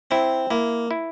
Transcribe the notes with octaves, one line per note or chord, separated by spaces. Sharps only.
C4 E4
A#3 E4
E4